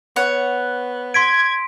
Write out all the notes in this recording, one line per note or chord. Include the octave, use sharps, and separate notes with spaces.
B3 C#5 F#5
C6 G#6 B6 D7